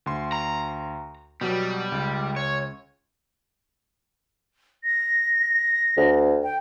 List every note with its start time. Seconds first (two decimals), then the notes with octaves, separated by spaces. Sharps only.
0.06 D2 C6
0.32 A#5
1.41 B2 F#3 G3
1.92 C#2
2.36 C#5
4.84 A#6
5.97 D2
6.43 G5